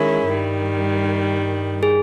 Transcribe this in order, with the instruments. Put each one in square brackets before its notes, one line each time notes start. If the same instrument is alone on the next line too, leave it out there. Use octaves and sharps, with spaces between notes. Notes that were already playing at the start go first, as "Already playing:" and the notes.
Already playing: [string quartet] D#3 G#3 C#4 E4 [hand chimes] A#4
[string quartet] G2 D#3 G3
[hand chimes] G#4